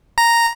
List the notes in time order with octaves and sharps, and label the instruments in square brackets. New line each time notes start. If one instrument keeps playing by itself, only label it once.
[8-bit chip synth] A#5